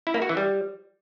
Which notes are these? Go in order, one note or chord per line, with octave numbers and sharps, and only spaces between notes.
E4
A#3
F#4
E3
G3